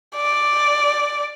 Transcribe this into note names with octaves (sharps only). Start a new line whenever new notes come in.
D5